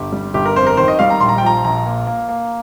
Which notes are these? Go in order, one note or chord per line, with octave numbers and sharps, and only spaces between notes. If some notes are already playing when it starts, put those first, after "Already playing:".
Already playing: G1 G4
G3
G1 G4
A#4
F2 C5
A#4
D#3 C5
D#5
G3 F5
A#5
A#1 C6
A#5
G5
F3 A#5
A#1 A#5
A#3
A#3
A#3